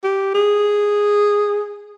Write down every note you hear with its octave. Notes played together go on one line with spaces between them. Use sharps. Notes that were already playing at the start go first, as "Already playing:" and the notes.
G4
G#4